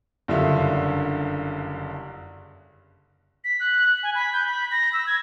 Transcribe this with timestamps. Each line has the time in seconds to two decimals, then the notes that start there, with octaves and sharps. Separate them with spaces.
0.28 F#1 G2 D3 F4 E5
3.44 B6
3.60 F#6
4.03 G#5
4.15 B5
4.33 G6
4.48 B5
4.72 A#6
4.93 E6
5.07 G#6